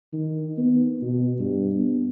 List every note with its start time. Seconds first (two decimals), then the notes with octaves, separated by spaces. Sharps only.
0.13 D#3
0.58 B3
1.02 B2
1.40 G2
1.73 B3